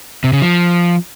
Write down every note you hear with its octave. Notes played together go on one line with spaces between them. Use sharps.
C3
C#3
F3